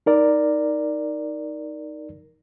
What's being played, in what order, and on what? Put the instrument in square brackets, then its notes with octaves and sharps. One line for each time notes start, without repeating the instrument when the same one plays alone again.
[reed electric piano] D#4 A#4 D5